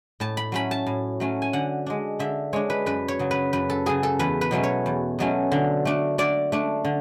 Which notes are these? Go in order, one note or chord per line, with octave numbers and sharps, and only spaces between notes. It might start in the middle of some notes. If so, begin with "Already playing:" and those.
A2 A5
B5
F#3 A3 C#4 B5
A5
A2
F#3 A3 C#4
G#5
D3 F#5
G#3 D4
D3 E5
G#3 D4 C#5
B4
F#2 B4
C#5
C#3 F#3
B4
F#2 B4
A4
C#3 F#3 G#4
A4
E2 B4
B4
B2 F#3 A3 C#4
C#5
E2
B2 F#3 A3 C#4
D3
A3 D4
D3 D5
A3 D4
D3